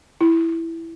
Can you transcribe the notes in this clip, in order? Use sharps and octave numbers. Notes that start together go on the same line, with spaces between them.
E4